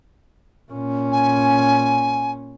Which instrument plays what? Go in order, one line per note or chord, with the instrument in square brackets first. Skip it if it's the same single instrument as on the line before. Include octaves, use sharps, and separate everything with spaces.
[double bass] A#2 C#4
[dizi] G#5